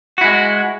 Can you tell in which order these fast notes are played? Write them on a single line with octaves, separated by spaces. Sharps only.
F#4 E4 G#3